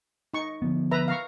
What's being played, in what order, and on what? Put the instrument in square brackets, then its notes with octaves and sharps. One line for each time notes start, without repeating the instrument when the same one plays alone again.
[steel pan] D#4 C#6
[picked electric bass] D3 F3 B3
[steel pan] B4 E5 A#5
F5 A#5 C#6